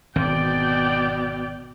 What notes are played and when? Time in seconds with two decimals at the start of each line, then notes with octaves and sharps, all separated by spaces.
0.16 G#1 B2 D3 C4 D5 G5